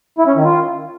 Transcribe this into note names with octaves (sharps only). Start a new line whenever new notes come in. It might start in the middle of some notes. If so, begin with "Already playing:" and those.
E4
C#4
D#3
F4